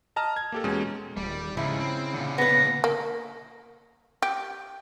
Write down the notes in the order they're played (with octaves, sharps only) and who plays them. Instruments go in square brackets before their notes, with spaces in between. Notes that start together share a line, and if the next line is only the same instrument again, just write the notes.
[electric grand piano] D#5 A5 A#5 F6
G#6
A#3 G4 A4
E2 B2 G#3 C#4
[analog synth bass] D#1 [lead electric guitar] G3
[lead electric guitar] G#2 F3 [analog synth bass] C#3 [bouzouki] E4
[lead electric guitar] C4
A#2 D3
[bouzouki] B3 B4 [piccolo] A#6
[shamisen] A#3
G4